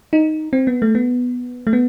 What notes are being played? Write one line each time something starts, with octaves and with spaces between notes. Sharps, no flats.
D#4
C4
B3
A3
B3
A3
B3